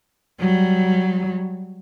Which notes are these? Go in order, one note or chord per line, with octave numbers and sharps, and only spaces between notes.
F#3 G3